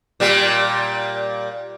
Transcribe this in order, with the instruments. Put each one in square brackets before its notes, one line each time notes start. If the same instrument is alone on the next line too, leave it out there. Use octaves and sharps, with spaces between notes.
[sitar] A#2 G3